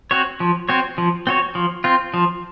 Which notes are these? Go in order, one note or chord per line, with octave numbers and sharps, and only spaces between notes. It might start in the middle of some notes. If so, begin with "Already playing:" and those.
C4 F#4 C#5
F3
C4 F#4 C#5
F3
C4 F#4 C#5
F3
C4 F4
F3